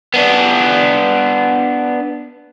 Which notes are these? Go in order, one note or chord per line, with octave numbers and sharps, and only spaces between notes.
B3 D4